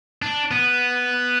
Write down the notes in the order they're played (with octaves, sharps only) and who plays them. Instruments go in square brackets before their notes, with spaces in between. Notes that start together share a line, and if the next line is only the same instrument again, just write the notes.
[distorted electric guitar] D4
B3